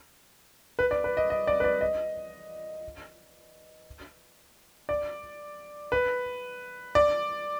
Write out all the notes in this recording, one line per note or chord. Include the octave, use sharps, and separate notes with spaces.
B4
D5
B4
D#5
D#5
D5
B4
D5
D#5
D5
B4
D5